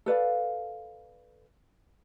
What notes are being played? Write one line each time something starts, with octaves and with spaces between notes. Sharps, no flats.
A4 B4 D5 F5